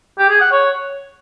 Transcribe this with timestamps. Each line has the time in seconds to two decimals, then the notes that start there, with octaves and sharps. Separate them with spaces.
0.18 G4
0.29 G#4
0.41 F#5
0.52 C#5